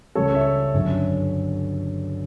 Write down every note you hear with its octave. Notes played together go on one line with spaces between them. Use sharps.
C#2 C#3 G3 C#4 A4 C#5
C#5 E5
G1 F#2 D3 F#3